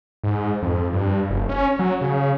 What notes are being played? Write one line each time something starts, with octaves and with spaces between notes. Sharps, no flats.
G#2
F2
G2
F#1
C#4
F#3
C#3